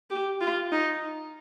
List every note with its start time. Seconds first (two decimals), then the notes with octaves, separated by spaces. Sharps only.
0.10 G4
0.41 F4
0.72 D#4